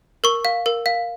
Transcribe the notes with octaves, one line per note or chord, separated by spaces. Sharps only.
A#4 C#6
F5
A#4
F5